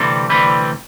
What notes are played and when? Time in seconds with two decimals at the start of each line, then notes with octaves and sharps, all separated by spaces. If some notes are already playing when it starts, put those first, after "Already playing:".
Already playing: D2 C3 E3 G3 C4 A4
0.29 D2 C3 E3 G3 C4 B4